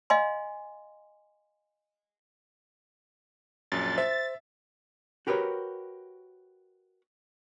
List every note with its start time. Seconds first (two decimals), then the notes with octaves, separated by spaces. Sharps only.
0.10 D#5 F5 G#5 C6
3.72 A#1 F#2 A6
3.98 C5 E5
5.27 F#4 G4 A#4 B4 C#5